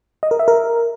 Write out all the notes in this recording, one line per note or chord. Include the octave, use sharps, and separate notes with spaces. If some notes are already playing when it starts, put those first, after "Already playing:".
D#5
A#4
E5
A#4